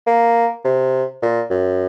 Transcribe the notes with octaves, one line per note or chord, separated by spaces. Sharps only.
A#3
C3
A#2
F#2